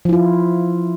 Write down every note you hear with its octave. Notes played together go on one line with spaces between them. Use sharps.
F3 E4 F4